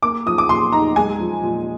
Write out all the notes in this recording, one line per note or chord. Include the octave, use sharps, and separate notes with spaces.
A#3 D6
F3 D#6
D6
A#2 C6
D#4 A#5
G#3 G#5
F3
A#2